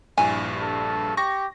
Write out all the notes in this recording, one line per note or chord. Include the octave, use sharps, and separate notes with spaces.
A#1 G2 E4 G#5
A4
G4 C#6 A#6